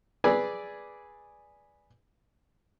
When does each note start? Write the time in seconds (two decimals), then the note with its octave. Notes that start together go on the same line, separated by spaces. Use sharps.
0.24 G#4 B4 D5 G#5 E6